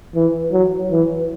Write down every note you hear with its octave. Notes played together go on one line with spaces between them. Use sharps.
E3
F#3
E3